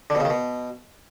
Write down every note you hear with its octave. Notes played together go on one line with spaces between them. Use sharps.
D3
B2
C#3
D#3
B2